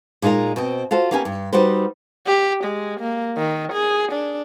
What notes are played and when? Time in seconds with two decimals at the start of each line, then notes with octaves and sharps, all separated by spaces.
0.22 A#2 G#3 D#4 F4 A#4
0.56 B2 C4 D#5
0.91 F4 F#4 A4 C5
1.11 A#3 B3 C#4 G4 G5 G#5
1.25 G2
1.53 G3 D#4 F#4 B4 C5
2.27 G4
2.64 G#3
3.00 A#3
3.37 D#3
3.73 G#4
4.12 D4